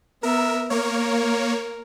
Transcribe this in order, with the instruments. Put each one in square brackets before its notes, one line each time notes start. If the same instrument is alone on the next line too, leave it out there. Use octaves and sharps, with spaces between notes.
[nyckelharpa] B3 E5 [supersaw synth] A#4
[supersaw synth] A#3 C#5 [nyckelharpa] A#4